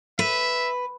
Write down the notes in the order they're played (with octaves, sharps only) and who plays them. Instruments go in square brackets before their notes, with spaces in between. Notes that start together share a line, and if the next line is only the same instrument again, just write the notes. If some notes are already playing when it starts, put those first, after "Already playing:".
[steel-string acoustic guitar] B4 [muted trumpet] E5